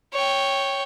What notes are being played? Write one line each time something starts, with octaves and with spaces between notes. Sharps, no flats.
C#5 G5